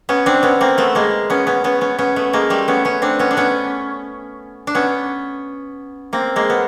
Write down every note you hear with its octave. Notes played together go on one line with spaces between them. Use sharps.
B3 C#4
C4 D4
B3 C#4
A#3 C4
A3 B3
G#3 A#3
B3 C#4
B3 C#4
B3 C#4
B3 C#4
B3 C#4
A3 B3
G#3 A#3
G3 A3
B3 C#4
B3 C#4
C4 D4
B3 C#4
D4
B3 C#4
D4
B3 C#4
A#3 C4
G#3 A#3
B3